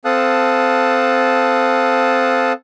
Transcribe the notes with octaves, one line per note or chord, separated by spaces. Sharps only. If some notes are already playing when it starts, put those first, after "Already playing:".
C4 A4 F5 A5 D#6 F#6